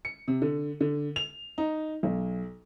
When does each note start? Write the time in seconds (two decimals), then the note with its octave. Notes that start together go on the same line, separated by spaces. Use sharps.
0.05 C#7
0.28 C3
0.42 D3
0.81 D3
1.16 F7
1.58 D#4
2.03 B1